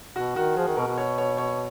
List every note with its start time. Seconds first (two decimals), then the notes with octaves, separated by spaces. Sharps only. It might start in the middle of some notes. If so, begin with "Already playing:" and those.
0.16 B2 F#4
0.36 D#3 F#4
0.57 F3 G#4
0.67 D#3
0.77 B2 A#4
0.88 B2
0.98 C#5
1.18 C#5
1.38 C#5